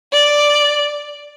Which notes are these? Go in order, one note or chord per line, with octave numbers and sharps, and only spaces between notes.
D5